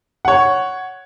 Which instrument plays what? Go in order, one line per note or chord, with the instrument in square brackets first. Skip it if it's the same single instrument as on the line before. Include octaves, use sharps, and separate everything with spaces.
[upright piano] C#5 F#5